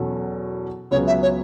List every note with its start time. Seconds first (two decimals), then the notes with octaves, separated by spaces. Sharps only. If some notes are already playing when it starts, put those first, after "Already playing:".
Already playing: E2 B2 F#3 C#4 A4
0.91 C#2 C#3 F#3 B3 C#5
1.06 E5
1.22 C#5